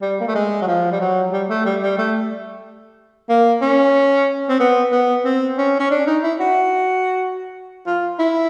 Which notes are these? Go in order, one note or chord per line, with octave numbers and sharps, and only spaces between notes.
G3
A#3
A3
G#3
F#3
F3
G3
F#3
G3
A3
G3
G3
A3
A#3
C#4
C4
B3
B3
C4
C#4
C#4
D4
D#4
E4
F#4
F4
E4